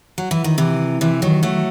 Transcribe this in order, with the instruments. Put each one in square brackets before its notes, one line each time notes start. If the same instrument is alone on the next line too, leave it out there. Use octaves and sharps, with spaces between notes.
[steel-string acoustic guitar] F#3
E3
D#3
C3 E3
C3 E3
D#3 F#3
F#3 A3